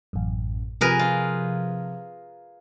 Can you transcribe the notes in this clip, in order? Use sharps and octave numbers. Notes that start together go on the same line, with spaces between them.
A1 F#2
C3 F3 G#4 A#4 B4
F4